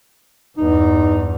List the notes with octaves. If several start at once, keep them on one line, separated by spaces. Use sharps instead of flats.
E2 G2 D#4